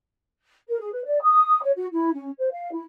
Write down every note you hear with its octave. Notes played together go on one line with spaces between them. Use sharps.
A#4
G#4
B4
D5
D#6
C#5
F#4
E4
C#4
C5
F5
E4